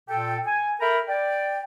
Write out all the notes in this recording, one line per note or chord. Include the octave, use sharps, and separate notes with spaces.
A#2 A4 G5
G#5
A4 A#4 E5 G5 A#5 B5
D5 G5